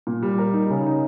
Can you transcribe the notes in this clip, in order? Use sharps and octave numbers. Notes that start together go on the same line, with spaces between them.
A#2
G3
A#4
D#4
C#3
D#4